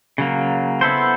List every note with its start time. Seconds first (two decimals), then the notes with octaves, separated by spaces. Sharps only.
0.18 C#3 F#3 A#3
0.81 B3 E4 A4 C5